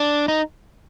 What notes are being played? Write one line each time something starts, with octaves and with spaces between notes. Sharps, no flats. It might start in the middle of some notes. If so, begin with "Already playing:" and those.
Already playing: D4
D#4